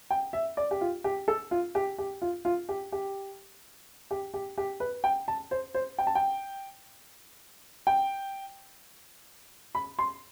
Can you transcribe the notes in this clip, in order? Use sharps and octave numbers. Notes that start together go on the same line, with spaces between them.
G5
E5
D5
G4
F4
G4
A4
F4
G4
G4
F4
F4
G4
G4
G4
G4
G4
B4
G5
A5
C5
C5
G5
A5
G5
G5
B5
C6